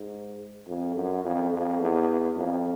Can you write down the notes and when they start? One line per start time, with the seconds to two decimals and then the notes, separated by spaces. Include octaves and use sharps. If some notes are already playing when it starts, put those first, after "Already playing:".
Already playing: G#2
0.68 F2
0.95 F#2
1.24 F2
1.52 F2
1.80 E2
2.36 F2